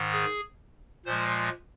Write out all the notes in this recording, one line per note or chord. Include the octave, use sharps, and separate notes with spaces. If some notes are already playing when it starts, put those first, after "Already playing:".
Already playing: G#2 D#3
G#4
A#2 F3 G#3 C5